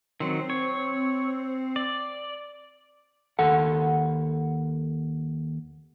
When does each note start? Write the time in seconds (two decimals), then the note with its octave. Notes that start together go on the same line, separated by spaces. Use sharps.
0.20 D#3 F#3 C4
0.50 C#5
1.76 D5
3.39 D#2 A4 F#5